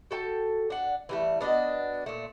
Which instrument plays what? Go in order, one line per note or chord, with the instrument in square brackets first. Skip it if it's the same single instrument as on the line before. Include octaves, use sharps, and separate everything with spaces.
[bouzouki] F#4 A4 G5 A5
D4 F#5
E3 G3 A3
B3 D4 F#4 D#5
A#2 A3